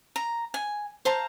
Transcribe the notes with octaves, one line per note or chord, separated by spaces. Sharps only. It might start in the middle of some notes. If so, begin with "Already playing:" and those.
A#5
G#5
C5 F5 A5 A#5